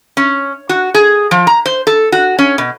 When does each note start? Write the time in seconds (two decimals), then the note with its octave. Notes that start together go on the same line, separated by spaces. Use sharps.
0.17 C#4
0.69 F#4
0.94 G#4
1.31 F3
1.47 A#5
1.66 C5
1.87 A4
2.12 F#4
2.39 C#4
2.58 B2